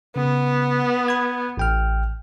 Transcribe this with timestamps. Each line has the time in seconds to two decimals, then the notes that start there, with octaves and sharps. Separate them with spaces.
0.16 C#3 B3
1.08 B5 G#6
1.57 A1 G5 F6